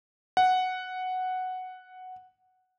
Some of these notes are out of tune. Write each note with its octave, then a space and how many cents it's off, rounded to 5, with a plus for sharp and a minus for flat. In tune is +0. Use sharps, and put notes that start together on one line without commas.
F#5 +0